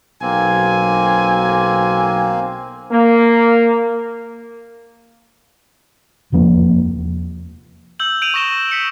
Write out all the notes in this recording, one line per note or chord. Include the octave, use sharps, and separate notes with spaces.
B1 A#3 C4 G#5
A#3
F1 E2 F3 A#3
E6 G6 F#7
G6 D7 D#7 F7 F#7
C#6 D#6 A#6 E7 G7
B6 C#7